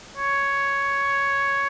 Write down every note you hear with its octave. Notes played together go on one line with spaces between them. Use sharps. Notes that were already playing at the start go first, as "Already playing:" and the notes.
C#5